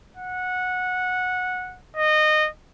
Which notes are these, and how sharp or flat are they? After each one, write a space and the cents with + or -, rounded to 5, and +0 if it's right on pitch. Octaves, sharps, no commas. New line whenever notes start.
F#5 -15
D#5 -20